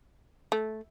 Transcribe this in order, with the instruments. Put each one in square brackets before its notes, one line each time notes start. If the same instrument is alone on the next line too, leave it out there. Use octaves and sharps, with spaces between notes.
[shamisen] A3